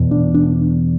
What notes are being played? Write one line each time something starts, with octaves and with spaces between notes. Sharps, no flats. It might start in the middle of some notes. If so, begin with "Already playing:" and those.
Already playing: E2 B2
D4
D4